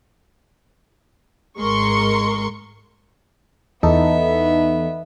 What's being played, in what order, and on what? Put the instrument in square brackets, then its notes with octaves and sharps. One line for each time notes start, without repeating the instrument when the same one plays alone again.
[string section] G#1 G#3 A#4 C6 C#6 C#7
[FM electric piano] E2 D#4 A4 [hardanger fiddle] B3 E5